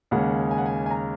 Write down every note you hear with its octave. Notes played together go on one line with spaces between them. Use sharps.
D#2 C#3 G#3 F#5
G#5
F#5
G#5
G#5
A#5